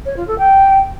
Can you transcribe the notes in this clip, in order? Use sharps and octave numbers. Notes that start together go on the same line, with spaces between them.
C#5
F4
A4
G5